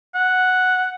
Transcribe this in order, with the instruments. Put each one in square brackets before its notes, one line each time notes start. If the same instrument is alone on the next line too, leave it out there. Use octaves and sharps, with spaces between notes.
[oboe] F#5